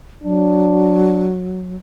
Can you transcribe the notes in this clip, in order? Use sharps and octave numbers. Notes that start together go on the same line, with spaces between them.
F#3 D4